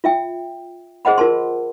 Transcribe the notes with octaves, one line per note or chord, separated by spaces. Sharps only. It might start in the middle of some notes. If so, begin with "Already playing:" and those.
F4 E5 G5
G#4 C5 D#5 F#5 B5
F4 A#4 A5 C6